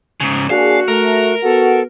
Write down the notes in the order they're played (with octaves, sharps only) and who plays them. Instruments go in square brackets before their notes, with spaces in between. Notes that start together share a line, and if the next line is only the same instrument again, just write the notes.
[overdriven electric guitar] G#2 C#3
[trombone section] A#3 D4 G#4 [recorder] F#4 [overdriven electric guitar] F5
[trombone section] A3 [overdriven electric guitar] A#4
[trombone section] B3 F#4 [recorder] A4